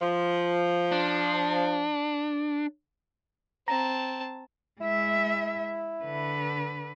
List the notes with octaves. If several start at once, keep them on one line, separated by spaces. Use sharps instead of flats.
F3
D4
C4 A5 A#5
G#3 E4 E5
D3 B4